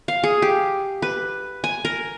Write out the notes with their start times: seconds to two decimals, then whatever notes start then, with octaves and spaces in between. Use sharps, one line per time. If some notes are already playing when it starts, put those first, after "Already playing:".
0.08 F5
0.24 G#4
0.42 G4
1.02 B4
1.64 G#5
1.85 A#4